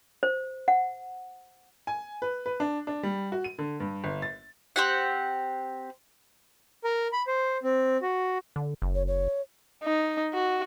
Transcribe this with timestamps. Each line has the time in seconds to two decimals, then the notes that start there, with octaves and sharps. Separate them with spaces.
0.23 C5
0.68 F#5
1.87 G#5
2.22 B4
2.46 B4
2.60 D4
2.87 D4
3.03 G3
3.32 F#4
3.44 D#7
3.59 D3
3.80 G2
4.04 G1
4.22 A6
4.76 C4 G4 F#5
6.84 A#4
7.13 B5
7.27 C5
7.63 C4
8.02 F#4
8.56 D3
8.82 F#1
8.95 C#5
9.08 C#5
9.84 D#4
10.34 F#4